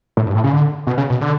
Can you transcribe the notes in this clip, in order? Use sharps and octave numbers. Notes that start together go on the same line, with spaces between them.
A2
G2
A2
C#3
D3
B2
C#3
B2
D3